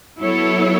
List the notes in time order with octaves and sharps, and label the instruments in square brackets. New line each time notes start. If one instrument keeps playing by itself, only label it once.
[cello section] F#3 B3 E4 A4 C#5